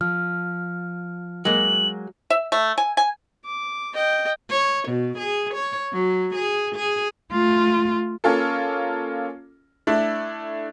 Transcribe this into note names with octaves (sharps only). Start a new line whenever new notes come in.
F3 F6
F#3 G#3 A#3 F#7
E5
A3
G#5
G#5
D6
D#5 G5
C#5
B2
G#4
C#5
F#3
G#4
G#4
A3 F4
A#3 C#4 F4 A4
A3 D4 E4